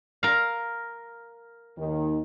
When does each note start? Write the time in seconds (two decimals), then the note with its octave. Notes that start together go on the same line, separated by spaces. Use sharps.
0.23 A#4 F5
1.78 D#2 D#3